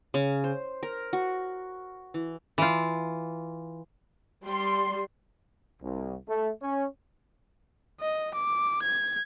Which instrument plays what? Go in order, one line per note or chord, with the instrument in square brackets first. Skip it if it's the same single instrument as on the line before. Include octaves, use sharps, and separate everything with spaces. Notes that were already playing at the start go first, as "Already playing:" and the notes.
[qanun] C#3
C5
A#4
F#4
E3
[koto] E3 F4
[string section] G3 C6
[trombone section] C2
A3
C#4
[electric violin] D#5
D6
G#6